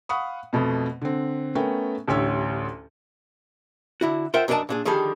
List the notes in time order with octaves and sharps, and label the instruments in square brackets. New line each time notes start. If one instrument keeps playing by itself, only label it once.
[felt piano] F5 F#5 B5 C#6 D#6
F2 B2 A3 B3
D3 C4
A3 B3 C#4 A#4 G5
A1 D2 G4 C#5 E6
[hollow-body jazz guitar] D3 E4 F#4
F4 A#4 C5 E5 F#5 G5
F#2 D4 A#4 D5 D#5 A5
A#2 D4 G#4
D3 D#3 F3 G3 G#4 A4